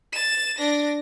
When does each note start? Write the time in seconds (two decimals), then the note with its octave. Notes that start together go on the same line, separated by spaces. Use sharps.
0.13 A6 E7
0.58 D4 A#6